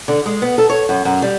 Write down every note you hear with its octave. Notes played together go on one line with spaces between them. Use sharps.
D3
G#3
B3
A4
C#5
F#2
F#2
G3